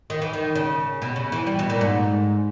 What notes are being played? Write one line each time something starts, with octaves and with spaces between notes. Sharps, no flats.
D#3
E3
D#3
C#3
B2
C#3
E3
G3
B2
A#2
G#2